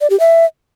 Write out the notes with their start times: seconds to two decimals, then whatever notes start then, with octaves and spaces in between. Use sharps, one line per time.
0.01 D5
0.10 G4
0.20 E5